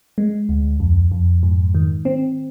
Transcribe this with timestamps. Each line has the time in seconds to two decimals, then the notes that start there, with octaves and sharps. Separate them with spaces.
0.18 G#3
0.49 D2
0.80 F2
1.12 F2
1.43 G#2
1.75 D#3
2.05 C4